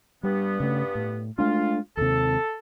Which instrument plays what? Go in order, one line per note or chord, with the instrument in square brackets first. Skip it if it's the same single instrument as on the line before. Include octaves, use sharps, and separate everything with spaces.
[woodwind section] G2 B3 [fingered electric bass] G3
[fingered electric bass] C#3 A3
A2
[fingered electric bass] G#3 A3 D4 [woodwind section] F4
[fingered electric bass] D#2 C3 [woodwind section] A4